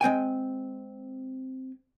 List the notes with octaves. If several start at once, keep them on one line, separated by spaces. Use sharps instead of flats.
G#3 C4 G5 G#5